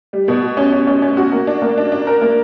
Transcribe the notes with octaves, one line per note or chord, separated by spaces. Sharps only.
G3
B2
F#4
C#4
C#4
C#4
C#4
F#4
A#3
D4
A#3
D4
D4
A#4
A#3